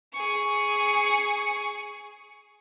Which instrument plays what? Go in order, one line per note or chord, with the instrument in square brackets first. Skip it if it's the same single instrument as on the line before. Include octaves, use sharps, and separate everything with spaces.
[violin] G#4 C#6